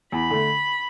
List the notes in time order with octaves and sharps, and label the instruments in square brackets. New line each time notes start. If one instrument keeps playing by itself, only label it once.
[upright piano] E2 [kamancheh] B5
[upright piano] D3 A3